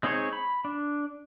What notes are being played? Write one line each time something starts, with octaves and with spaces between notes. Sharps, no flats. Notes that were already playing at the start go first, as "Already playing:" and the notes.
G#3 C4 D#4 G#4 C#5
B5
D4